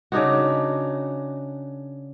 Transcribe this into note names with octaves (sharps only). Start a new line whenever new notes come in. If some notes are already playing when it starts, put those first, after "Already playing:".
C#3 D4 D#4 F#4